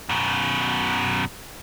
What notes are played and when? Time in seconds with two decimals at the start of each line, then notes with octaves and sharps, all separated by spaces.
0.09 F#2 B2